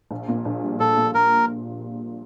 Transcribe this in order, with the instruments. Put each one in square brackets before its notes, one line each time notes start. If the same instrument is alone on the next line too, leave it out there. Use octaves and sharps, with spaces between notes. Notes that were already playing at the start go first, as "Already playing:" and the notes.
[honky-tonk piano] A#1
A#2
A#1
G3
[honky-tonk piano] A#1 [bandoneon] A4
[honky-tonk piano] A#2
[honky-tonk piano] A#1 [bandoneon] A#4